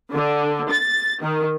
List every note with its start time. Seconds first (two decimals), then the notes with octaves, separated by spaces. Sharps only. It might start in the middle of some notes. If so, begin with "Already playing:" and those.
0.12 D3
0.71 A6
1.22 D#3